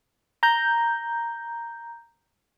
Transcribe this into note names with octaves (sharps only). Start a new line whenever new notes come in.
A#5 G6